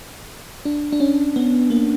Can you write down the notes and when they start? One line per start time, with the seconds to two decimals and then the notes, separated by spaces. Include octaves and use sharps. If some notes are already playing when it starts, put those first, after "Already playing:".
0.65 D4
0.92 D4
1.00 C#4
1.36 B3
1.70 A#3